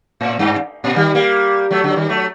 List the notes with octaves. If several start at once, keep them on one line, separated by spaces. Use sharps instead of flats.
A2
G2
A#2
D#3 G3
G3 A#3
F#3 A3
D3 F#3
D#3 G3
F#3 A3